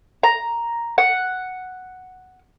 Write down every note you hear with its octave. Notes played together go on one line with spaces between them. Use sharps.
A#5
F#5